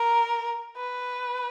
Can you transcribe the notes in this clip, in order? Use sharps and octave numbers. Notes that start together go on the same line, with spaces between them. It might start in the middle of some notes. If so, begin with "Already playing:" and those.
Already playing: A#4
B4